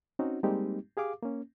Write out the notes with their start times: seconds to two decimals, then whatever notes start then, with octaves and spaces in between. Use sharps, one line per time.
0.19 C4 C#4 D#4 F#4
0.43 G3 G#3 A#3 C4 D#4 G4
0.97 G4 G#4 F5 D6
1.22 A#3 C#4